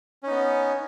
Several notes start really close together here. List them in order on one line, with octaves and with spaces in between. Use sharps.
C#4 D#4 B3